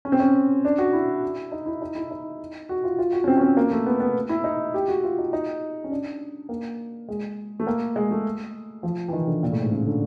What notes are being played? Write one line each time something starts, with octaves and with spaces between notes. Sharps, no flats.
C#4
C4
C#4
D4
F#4
E4
D#4
E4
D#4
E4
D#4
F#4
F4
F4
F#4
C#4
C4
C#4
C4
A#3
A3
B3
B3
E4
D#4
G4
F#4
F4
D#4
D#4
C#4
D4
A#3
G#3
A3
A#3
G#3
A3
F3
E3
D#3
D3
A#2
A2
G#2
C#3
D3